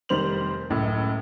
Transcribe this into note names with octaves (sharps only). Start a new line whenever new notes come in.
F1 D#3 G3 C5 F7 F#7
C#2 F#2 A2